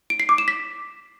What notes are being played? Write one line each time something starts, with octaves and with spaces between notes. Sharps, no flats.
D7
C7
D6
E7
B6